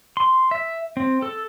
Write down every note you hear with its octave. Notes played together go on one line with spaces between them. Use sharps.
C6
E5
C4
A4